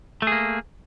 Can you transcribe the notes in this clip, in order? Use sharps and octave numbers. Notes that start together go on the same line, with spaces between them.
A3 A#3 G#4